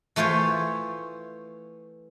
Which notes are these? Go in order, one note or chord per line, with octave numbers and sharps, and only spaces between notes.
E3 A3 F4 C5 C#5